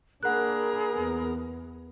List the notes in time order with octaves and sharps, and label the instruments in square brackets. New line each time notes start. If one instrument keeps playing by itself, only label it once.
[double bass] A#3 D4 [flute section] G#4 B5 [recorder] A#4 [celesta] F#5 F#6
[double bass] E2 B3